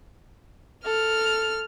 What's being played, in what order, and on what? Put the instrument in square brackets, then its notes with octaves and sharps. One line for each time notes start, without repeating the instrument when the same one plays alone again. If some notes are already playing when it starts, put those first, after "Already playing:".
[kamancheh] A4 [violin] F6